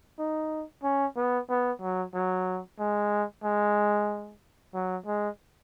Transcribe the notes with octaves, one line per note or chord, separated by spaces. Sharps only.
D#4
C#4
B3
B3
F#3
F#3
G#3
G#3
F#3
G#3